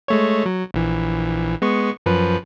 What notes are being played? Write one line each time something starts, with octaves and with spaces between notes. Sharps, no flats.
G#3 A3 C#5
F#3
A#1 E3
G#3 B3 C#6
F#2 F3 B4